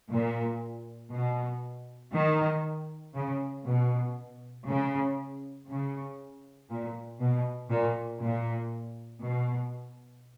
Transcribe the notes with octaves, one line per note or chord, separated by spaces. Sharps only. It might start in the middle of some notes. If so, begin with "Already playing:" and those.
A#2
B2
D#3
C#3
B2
C#3
C#3
A#2
B2
A#2
A#2
B2